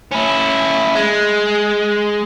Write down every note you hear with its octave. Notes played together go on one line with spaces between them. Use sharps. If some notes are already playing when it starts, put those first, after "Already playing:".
C#4 E4
G#3